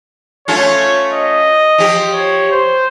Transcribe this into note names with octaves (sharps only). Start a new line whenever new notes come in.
A3 C#4 F4 C#5
D#5
F3 G4
C#5
C5